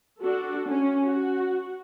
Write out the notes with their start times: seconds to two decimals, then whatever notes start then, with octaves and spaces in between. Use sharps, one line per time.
0.21 D4 F#4 A4
0.69 C#4
1.05 F#4